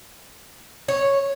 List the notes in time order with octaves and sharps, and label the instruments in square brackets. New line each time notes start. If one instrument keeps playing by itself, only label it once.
[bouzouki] C#5